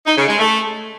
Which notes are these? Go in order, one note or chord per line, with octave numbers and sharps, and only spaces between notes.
D#4
C#3
G#3
A3